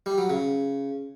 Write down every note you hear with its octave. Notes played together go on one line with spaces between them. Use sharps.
G3
F#3
C#3